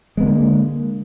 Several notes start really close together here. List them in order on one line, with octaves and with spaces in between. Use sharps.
G#3 B3 D3 A#3